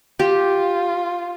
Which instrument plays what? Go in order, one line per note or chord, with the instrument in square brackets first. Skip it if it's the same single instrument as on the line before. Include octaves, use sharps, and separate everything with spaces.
[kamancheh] F4 [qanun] G4